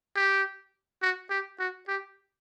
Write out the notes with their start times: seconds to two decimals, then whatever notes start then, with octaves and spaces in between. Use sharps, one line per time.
0.16 G4
1.03 F#4
1.30 G4
1.60 F#4
1.88 G4